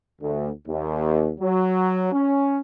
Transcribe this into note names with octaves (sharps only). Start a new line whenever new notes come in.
D2
D#2
F#3
C#4